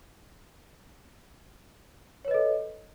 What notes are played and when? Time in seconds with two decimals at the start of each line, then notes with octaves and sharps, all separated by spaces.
2.25 C#5
2.28 B4
2.31 D#5
2.34 A4